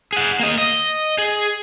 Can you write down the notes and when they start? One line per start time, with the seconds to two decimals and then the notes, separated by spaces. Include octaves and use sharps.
0.13 G#4 F#5
0.40 A#3 D#5
0.58 D#5
1.18 G#4